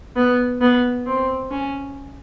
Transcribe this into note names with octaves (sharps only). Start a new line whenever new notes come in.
B3
B3
C4
C#4